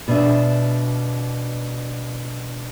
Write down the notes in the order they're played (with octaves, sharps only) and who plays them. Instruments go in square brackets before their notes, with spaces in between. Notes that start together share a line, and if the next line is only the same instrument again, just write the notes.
[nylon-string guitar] B2 D4 E5